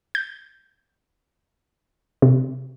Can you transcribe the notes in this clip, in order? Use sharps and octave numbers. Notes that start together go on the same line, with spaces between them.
G6
C3